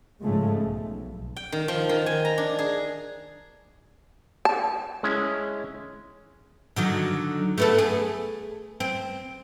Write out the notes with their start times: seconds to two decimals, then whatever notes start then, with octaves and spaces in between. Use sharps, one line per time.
0.23 G#2 C#3 F3 G#3 A3
0.62 B1
1.36 G5
1.52 D#3
1.68 F3
1.89 D#3
2.06 G#5
2.25 A#5
2.38 D4
2.59 G#4
4.45 A5
5.03 G#3 C#4 E4
6.76 D3 D#3 F#3
7.58 A3 B3 A4
7.78 G#4
8.80 C4